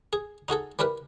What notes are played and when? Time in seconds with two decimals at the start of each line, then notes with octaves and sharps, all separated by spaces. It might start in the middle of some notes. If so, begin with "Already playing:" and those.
0.13 G#4
0.48 D#4 F#4 G#4 A4
0.79 E3 G3 G4 A#4 B4